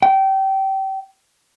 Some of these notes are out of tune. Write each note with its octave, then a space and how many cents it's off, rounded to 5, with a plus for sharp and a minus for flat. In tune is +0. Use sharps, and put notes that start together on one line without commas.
G5 -25